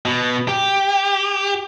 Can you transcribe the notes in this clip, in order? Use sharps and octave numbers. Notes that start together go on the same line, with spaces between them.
B2
G4